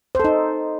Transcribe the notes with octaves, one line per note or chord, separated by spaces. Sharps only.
D#4 A4 C5